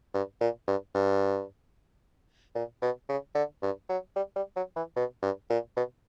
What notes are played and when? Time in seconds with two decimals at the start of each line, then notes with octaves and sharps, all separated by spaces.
0.14 G2
0.41 A#2
0.68 G2
0.95 G2
2.55 A#2
2.82 B2
3.09 C#3
3.35 D3
3.62 G2
3.89 F#3
4.16 G3
4.36 G3
4.56 F#3
4.76 E3
4.96 B2
5.22 G2
5.50 A#2
5.77 B2